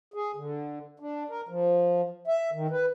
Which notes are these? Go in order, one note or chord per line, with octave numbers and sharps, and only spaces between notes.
G#4
D3
D4
A#4
F3
E5
D#3
B4